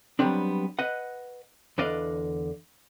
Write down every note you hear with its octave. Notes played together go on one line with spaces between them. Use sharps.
F#3 G3 B3 C4 D4
B4 D#5 F#5
E2 D3 B4 D5 D#5 F5